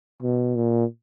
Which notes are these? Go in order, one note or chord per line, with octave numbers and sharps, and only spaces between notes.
B2
A#2